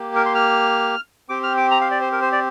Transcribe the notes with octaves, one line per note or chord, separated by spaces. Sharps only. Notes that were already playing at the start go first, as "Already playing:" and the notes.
Already playing: A#3 G4
A#4
C6
F6
C4 G4 D6
F6
D6
A#5
F5
D5
C5
A#4
C5
D5